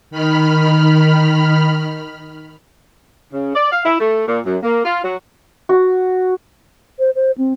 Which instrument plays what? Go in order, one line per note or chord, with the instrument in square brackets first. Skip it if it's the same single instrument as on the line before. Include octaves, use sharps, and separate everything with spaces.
[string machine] D#3 B5 F6
[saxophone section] C#3
D5
F5
E4
A3
A#2
F#2
A#3
F4
F#3
[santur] F#4
[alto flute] C5
C5
C4